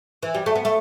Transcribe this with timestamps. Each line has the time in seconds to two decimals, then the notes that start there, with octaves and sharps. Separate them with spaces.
0.23 E3
0.35 G3
0.46 A3
0.55 B3
0.65 A3